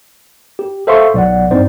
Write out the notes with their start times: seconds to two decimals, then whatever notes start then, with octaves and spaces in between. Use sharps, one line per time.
0.59 G4
0.87 A4 C5 E5 F5 C6 C#6
1.14 B1 D5 F#5
1.51 G2 C4 D#4 C5 D5